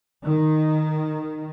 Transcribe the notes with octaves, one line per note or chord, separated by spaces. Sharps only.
D#3